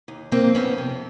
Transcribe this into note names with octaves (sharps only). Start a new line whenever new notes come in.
D#2
F2 A#3 C4
F2 B3 C#4
C3